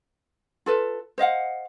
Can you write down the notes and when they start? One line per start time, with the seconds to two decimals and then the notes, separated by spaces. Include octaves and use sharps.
0.66 F4 A4 B4
1.18 C5 D#5 F5 F#5